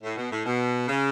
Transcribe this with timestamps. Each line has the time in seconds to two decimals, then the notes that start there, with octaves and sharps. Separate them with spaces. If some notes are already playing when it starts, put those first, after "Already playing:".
0.03 A2
0.16 B2
0.31 A2
0.46 B2
0.88 C#3